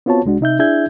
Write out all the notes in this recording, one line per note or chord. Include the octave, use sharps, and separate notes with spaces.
B3 C4 F4 F#4 C#5 A5
C2 G#3 D4 F#4
C3 D#4 E5 G6
D4 E4 G#4 E5 G6 G#6